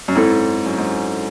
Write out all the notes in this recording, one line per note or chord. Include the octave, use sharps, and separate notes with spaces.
F#2
G#2 C4 E4 A4
F#2
G#2